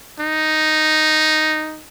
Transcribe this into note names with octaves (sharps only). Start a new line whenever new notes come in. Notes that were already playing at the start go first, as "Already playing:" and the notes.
D#4